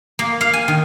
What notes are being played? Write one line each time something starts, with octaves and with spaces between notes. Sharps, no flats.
A#3
F5
G#5
D#3